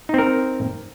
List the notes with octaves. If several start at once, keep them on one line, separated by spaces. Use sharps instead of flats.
C4 D#4 A#4